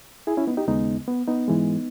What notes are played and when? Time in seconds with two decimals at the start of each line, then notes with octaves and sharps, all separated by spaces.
0.27 E4 G#4
0.37 C#4 E4
0.47 B3 D#4
0.57 D#4 G4
0.68 D#2 C#3 G#3 B3 D#4
1.08 B3
1.28 B3 D#4
1.48 G#2 E3 G#3